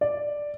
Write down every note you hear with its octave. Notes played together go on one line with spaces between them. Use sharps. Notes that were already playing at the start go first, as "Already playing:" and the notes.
D5